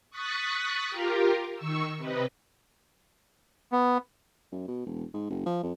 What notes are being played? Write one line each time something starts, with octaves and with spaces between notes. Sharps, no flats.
C#6 D#6 F#6 A6 B6 C#7
F4 G4 A#4
D#3 C#6 E6
C3 B4 D#5
B3
F#2
B2
E1
G#2
F#1
F3
F2